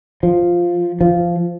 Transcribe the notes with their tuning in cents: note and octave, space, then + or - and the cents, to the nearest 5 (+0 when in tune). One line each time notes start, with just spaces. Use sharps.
F3 +0
F3 -10